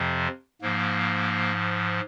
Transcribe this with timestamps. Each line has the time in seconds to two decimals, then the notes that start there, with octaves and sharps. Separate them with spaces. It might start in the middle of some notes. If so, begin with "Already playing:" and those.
Already playing: F2 C3 F3
0.62 G#2 F3 A#3